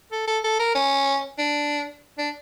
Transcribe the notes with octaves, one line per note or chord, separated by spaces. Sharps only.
A4
A4
A4
A#4
C#4
D4
D4